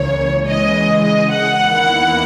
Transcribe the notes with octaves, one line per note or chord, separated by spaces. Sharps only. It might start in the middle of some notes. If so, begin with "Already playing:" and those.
Already playing: C#2 C#3 E3 A#3 C#5
C#3 E3 G#3 D#5
D#5
F#5
E2 D#3 A#3 E4